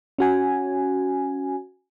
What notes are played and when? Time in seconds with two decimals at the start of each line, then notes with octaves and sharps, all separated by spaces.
0.18 C#4 F#4 G#5